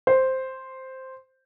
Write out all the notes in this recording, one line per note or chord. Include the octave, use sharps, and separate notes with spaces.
C5